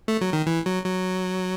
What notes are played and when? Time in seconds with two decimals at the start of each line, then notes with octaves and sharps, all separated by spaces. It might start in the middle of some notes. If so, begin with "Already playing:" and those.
0.08 A3
0.21 F#3
0.33 D#3
0.46 E3
0.66 F#3
0.84 F#3